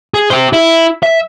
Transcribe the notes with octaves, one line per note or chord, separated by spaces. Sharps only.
G#4
G4 C5
E4
E5